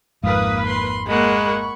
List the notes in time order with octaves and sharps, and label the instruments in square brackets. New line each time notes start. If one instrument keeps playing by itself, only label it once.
[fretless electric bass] G#1 F2 G#2 [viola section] A#3 B4 [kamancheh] F5 D#6
[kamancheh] B5 C6
[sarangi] G#3 [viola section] A#3 F#5 [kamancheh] B5 C#6